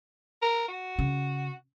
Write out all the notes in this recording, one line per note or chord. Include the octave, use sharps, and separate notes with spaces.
A#4
F#4
C#3